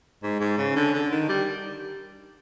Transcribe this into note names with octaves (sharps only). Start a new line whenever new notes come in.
G#2
G#2
C#3
D3
D3
D#3
G3